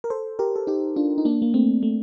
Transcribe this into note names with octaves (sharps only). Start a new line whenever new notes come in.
A#4
A4 C5
G4 A#4
A4
D#4 G4
D4 F4
D#4
A#3 D4
A#3
A3 C4
A3